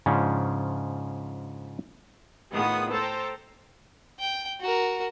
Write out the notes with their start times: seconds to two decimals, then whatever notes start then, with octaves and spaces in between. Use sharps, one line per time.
0.06 G#2 C#3 F3 C#4 D4
2.53 A2 D#3 B3 F4 G#4 D#6
2.93 A4 C5 G5 A5 A#5
4.19 G5
4.61 F#4 A#4